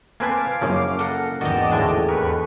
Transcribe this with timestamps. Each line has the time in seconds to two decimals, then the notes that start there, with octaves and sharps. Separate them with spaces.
0.20 A#3 C4 B4 F5 G#5 A5 D6
0.61 F#2 C#3 F3 A#3 C#4 E4
0.99 A4 F5 F#5 A#5
1.41 G#1 E2 F#4 G4 D5 D#5 A5
1.72 A2 D3 D4 G#4 A4 G#5
2.09 D#2 A#4 B4 C#6